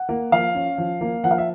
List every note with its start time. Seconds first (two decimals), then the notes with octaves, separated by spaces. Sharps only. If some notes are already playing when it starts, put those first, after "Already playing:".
Already playing: F#5
0.09 A#3
0.32 F3 F5
0.55 C#4
0.78 F3
1.01 A#3
1.24 F3 F#5
1.31 F5
1.38 E5